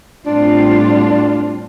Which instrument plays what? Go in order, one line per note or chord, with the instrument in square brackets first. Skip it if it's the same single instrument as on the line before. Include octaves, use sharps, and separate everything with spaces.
[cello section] A2 G3 C4 F4 [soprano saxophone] D4